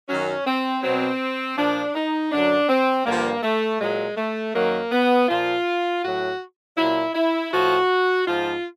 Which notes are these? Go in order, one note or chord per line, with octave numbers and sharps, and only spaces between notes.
F#2 D#3 F#3 C#4
C4
B2 F#3 C4
A#2 F3 D4
D#4
F#2 D3 F#3 D4
C4
G2 D3 F3 A#3
A3
A#2 F#3 G#3
A3
F#2 D#3 F#3 A#3
B3
A#2 F3 F4
A2 F#3 F#4
A#2 F#3 E4
E4
A2 F3 F#4
G#2 F3 F4